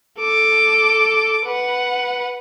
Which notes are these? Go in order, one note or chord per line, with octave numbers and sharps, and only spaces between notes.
A4 D6
B4 F#5